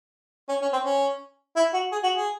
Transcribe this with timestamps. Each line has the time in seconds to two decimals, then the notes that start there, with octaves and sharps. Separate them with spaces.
0.49 C#4
0.62 C#4
0.73 C4
0.85 C#4
1.56 E4
1.74 F#4
1.92 G#4
2.04 F#4
2.16 G#4